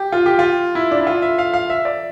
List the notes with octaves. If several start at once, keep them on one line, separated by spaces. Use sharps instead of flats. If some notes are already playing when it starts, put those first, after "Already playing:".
Already playing: G4
F4
G4
F4
E4
D4
E4
F4
E5
F5
F5
E5
D5